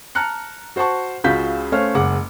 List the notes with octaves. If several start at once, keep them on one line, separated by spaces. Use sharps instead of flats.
A5 A#5 F6 F#6 C#7
F#4 C5 F#5 A5 C#6
C#2 C#3 F4 F#4 G6 B6
A3 C#4 C5 C#5 F5 F6
F#1 G#3 F#5 D6